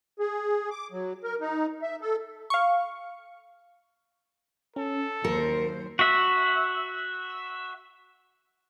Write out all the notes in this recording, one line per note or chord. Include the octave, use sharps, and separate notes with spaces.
G#4
D6
F#3
A#4
D#4
E5
A4
F5 C#6
C#4 A4
D#2 F#3 A#4 C5 C#7
F#4 E5